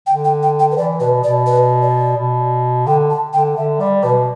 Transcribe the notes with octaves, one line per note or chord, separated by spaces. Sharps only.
D3 G5
G5
G5
G5
B4
E3 D5
B2 B4
B2 D5
B4
D5
B2
D3 G5
A5
D3 G5
D3 E5
G3 D5
B2 B4